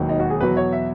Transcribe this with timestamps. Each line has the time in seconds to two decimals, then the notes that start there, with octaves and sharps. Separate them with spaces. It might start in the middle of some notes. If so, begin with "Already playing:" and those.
Already playing: E1 D#2 D#3 F#3
0.09 D#4
0.19 F#4
0.30 G#4
0.41 E2 B2 F#3 B4
0.57 C#5
0.72 E5